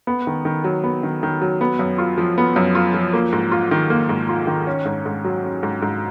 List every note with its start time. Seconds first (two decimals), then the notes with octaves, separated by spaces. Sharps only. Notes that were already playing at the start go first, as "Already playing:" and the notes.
0.07 B3
0.27 D#3
0.45 D#3
0.64 F#3
0.84 B3
1.03 D#3
1.23 D#3
1.42 F#3
1.61 B3
1.79 F#2
1.98 F4
2.18 F3
2.38 B3
2.56 F#2
2.75 F4
2.94 F3
3.13 A#3
3.32 G#2
3.52 F4
3.71 D#3
3.90 A#3
4.09 G#2
4.29 F4
4.47 D#3
4.67 C#4
4.85 G#2
5.06 G#2
5.25 F#3
5.44 C#4
5.63 G#2
5.82 G#2